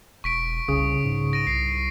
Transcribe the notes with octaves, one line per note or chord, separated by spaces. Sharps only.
E1 C#6 B6 D7
C2 C#3 D#6
G#2
A#6 D7 D#7
C2 C7